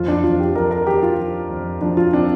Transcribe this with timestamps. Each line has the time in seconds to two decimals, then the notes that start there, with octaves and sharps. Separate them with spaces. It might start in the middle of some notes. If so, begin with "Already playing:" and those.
Already playing: F2 F4
0.08 D4
0.23 F2 F4
0.40 G4
0.56 F2 A#4
0.71 A#4
0.87 F3 G4
1.03 F4
1.19 F3
1.50 F2
1.81 F3 D4
1.97 F4
2.13 C4 D4